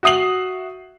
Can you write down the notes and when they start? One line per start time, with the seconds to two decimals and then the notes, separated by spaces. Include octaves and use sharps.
0.03 F#4 E5 D#6 C7 F#7